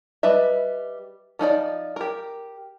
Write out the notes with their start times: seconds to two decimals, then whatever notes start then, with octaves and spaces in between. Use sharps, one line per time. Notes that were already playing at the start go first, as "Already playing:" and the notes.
0.23 G3 B4 D#5 E5
1.39 F3 D#4 F4 D5
1.96 G4 A#4